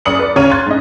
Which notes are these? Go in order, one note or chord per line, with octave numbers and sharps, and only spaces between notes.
F#1 F#2 D5 D#6 C#7 F#7
B4 D5
D2 C#3 C#5 A#5 F6 D#7
C6 F#6 G#6 A6
G#2 C#4 D#5